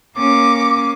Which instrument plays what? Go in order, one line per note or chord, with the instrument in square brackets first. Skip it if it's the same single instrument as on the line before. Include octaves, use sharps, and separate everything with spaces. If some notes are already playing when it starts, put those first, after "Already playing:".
[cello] A#3 C#4 [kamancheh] D6